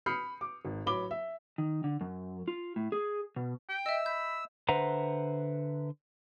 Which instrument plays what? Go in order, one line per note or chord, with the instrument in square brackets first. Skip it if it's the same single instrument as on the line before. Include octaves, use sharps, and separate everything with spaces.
[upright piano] B5 D#6 F6 G6 C7 C#7
D6
G#1
A1 F#3 B5 D6 G7
E5
[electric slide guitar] D#3
D3
F#2
F4
A2
G#4
B2
[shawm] G5
[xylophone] D#5 E5 [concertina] E6
[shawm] B5 [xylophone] G6
[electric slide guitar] D3 B4 C5 E5 F#5 A#5